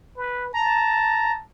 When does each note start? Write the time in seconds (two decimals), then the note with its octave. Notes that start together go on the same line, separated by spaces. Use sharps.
0.17 B4
0.54 A5 A#5